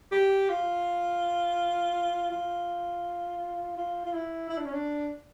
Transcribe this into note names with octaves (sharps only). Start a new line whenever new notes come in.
G4
F4
F4
F4
F4
E4
E4
D4
C#4
D4